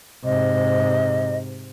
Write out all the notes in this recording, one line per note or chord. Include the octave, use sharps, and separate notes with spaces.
G#2 C3 D#5